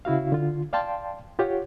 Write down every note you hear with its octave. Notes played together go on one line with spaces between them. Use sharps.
C#3 E4 F#4 F5
D3 F4
D5 F5 G5 A5 C6
F4 G4 C#5 F#5